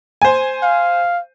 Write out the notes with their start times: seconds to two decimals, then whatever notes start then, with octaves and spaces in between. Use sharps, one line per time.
0.22 C5 G#5
0.63 F5